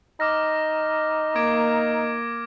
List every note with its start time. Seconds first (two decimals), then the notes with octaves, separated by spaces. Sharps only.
0.20 D#4 D6 F6 A#6
1.36 A#3 D6 G#6 D7